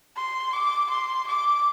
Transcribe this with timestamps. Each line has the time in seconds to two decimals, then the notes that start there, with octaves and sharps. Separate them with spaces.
0.16 C6
0.53 D6
0.91 C6
1.28 D6